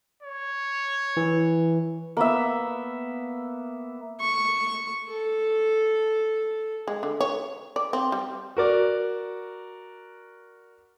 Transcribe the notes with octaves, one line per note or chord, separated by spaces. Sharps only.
C#5
E3
A#3 B3 E5
C#6
A4
G#3
D3
C#5
D5
C4
G3
F#4 A#4 D5